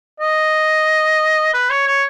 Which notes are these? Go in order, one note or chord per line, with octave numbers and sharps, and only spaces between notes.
D#5
B4
C#5
C#5